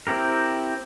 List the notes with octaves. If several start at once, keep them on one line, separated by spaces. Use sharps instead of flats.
C4 E4 G4 A#4